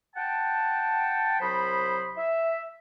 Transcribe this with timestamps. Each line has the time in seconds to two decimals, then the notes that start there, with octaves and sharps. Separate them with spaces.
0.15 F#5 G5 A5
1.40 C2 F#3 C5 D#5 B5
2.16 E5